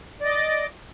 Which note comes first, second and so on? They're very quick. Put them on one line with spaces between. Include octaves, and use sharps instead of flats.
D5 D#5 D6